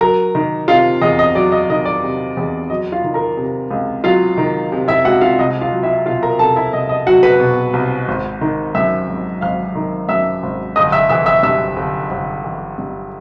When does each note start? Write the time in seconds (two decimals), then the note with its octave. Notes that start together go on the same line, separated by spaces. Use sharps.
0.01 F#3 A#4 A#5
0.35 D#3
0.68 C3 F4 F5
1.01 E2 D#5
1.19 D#5
1.35 F#3 D5
1.52 D#5
1.70 D#3 D#5
1.85 D5
2.03 C3
2.37 E2
2.70 F#3 D#5
2.92 F4 F5
3.04 D#3
3.14 A#4 A#5
3.37 C3
3.71 C#2
4.04 F#3 F4 F5
4.38 D#3
4.72 C3
4.88 E4 E5
5.05 C#2 F#4 F#5
5.21 F4 F5
5.39 C2 D#5
5.61 F4 F5
5.72 F#3
5.83 E4 E5
6.06 B2 F4 F5
6.23 A#4 A#5
6.39 C2 A4 A5
6.56 E4 E5
6.73 C2 D#5
6.89 D#5
7.06 F#3 F#4 F#5
7.23 B4 B5
7.40 B2
7.73 C2
8.08 G#1
8.41 D#3
8.75 F#2 E5 E6
9.09 G#1
9.41 G#1 F5 F6
9.75 D#3
10.09 F#2 E5 E6
10.43 G#1
10.76 G1 D#5 D#6
10.92 E5 E6
11.09 E3 E5 E6
11.26 E5 E6
11.43 G2 E5 E6
11.76 G1
12.11 G1
12.44 E3
12.78 G2